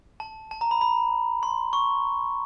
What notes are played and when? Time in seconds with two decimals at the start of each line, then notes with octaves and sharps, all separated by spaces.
0.20 A5
0.51 A5
0.61 A#5
0.71 B5
0.81 B5
1.43 C6
1.73 C#6